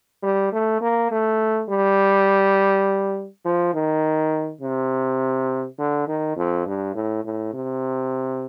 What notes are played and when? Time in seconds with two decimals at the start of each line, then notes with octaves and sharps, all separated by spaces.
0.23 G3
0.52 A3
0.81 A#3
1.11 A3
1.69 G3
3.45 F3
3.74 D#3
4.61 C3
5.79 D3
6.07 D#3
6.36 F2
6.66 G2
6.95 A2
7.25 A2
7.54 C3